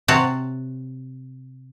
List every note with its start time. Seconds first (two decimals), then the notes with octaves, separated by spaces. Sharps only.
0.08 C3 C4 F#4 C#5 A5